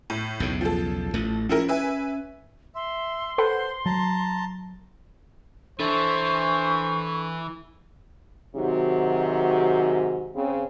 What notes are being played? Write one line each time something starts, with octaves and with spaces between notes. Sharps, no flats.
A2
B1 E2 C#3
F3 A4
A1 A3
F3 C#4 E4 A#4
B4 E5 G#5
E5 C6
A4 B4 C5 F#5
F#3 A5 A#5
E3 D4 E4 A4 C5 C#6 A6
G#2 C3 D#3 F#3 F#4
C#3 C4